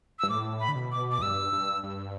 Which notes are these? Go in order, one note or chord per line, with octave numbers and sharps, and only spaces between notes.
G2 E6
A2 D6
B5
D3
B2
D6
D6
E2
G2 E6
G2
G2